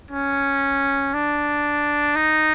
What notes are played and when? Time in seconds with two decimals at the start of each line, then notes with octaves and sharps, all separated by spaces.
0.11 C#4
1.14 D4
2.16 D#4